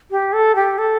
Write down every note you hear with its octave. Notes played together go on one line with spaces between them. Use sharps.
G4
A4
G4
A4